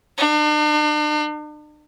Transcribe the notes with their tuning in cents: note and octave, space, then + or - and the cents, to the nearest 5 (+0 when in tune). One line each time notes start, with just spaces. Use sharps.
D4 +45